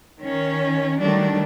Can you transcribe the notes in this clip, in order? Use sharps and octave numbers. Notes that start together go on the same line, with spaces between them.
D#3 C#4
D#3 F#3 G3 A3 D4